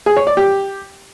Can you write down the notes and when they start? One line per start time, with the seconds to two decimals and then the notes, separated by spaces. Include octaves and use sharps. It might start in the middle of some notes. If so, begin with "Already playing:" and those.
0.06 G#4
0.17 C#5
0.27 D5
0.37 G4